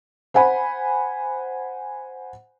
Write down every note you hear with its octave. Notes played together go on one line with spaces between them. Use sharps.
C5 F#5 G#5 B5